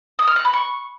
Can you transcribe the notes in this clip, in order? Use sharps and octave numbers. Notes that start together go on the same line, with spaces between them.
D#6
F6
F#6
B5
C#6